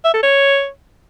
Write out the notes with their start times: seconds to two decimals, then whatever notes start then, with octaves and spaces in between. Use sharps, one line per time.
0.05 E5
0.14 A4
0.23 C#5